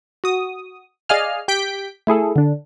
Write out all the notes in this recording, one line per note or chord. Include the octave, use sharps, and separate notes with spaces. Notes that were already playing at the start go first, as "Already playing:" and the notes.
F#4 D#6
G#4 D5 D#5 F5 G#5 F6
G4 G6 B6 D7
A3 E4 G#4 A4
D3 D4